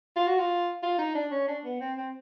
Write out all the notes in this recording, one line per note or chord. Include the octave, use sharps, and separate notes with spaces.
F4
F#4
F4
F4
D#4
D4
C#4
D4
B3
C4
C4